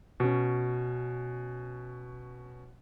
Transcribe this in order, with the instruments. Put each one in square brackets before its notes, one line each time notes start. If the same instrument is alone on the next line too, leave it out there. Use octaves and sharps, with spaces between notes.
[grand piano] B2 C#4